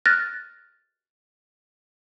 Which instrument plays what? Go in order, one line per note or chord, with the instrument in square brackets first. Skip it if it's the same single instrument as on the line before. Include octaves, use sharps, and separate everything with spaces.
[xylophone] F6 F#6 A6 A#6